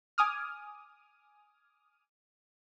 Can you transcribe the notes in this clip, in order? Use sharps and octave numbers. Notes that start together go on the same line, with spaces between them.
G#5 D6 D#6 F6